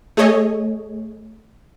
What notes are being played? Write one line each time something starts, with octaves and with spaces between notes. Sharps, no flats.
A3 G#4 A4 C#5 D#5